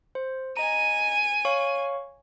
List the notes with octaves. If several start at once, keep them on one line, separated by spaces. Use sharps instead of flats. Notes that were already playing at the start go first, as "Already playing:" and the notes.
C5
D#5 G#5 A#5 D#7
C#5 F5 C#6